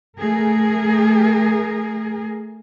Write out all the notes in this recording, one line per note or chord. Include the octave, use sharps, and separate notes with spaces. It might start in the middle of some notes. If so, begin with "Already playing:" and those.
A3 G#4 A#4